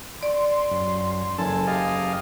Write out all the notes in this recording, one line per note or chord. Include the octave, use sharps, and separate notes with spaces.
D5 C6
F#2
F#1 A4 G#5 A5
G4 D#5 F5